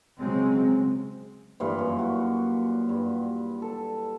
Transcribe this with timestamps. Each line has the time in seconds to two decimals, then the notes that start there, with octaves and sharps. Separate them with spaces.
0.20 C#3 F#3 G#3 C4
1.60 G2 A#2 E3
1.79 F#2
1.99 F#4
2.89 G2
3.62 A4